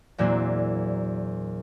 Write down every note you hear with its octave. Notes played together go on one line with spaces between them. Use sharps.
E2 A#2 F#3 A#3 C4 D4